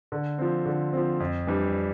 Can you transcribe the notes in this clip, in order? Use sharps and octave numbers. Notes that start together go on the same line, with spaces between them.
D3
F3 C4
D3
F3 C4
F2
E3 G3 D4